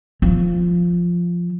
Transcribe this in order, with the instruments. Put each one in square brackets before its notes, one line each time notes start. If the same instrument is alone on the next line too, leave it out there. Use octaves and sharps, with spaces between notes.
[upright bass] F3